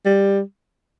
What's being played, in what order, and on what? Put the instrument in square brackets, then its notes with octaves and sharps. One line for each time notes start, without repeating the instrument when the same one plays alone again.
[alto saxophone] G3